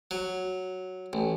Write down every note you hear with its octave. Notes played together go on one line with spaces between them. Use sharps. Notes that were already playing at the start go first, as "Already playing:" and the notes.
F#3
A1